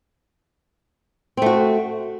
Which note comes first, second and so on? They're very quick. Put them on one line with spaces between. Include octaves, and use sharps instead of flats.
C4 A3 F#4